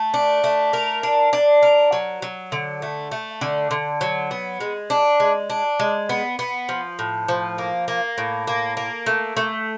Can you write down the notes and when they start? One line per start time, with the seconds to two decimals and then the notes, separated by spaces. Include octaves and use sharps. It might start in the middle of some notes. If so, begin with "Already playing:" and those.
Already playing: A3
0.14 D4
0.44 A3
0.73 A#4
1.03 D4
1.33 D4
1.63 A#4
1.92 F#3
2.22 F#3
2.52 D3
2.82 A3
3.12 A3
3.41 D3
3.71 D3
4.01 F#3
4.31 B3
4.60 G#3
4.90 D4
5.20 G#3
5.50 D4
5.80 G#3
6.09 B3
6.39 B3
6.69 F3
6.99 A2
7.28 F3
7.58 A#3
7.88 A#3
8.18 A2
8.47 A#3
8.77 A#3
9.06 A3
9.37 A3